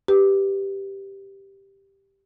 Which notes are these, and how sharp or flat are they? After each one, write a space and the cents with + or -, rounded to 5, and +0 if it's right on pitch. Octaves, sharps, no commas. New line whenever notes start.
G4 +0 B4 +0